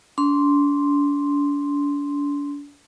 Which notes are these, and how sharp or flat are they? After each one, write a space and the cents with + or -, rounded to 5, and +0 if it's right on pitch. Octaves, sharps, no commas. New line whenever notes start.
D4 -40 C6 +0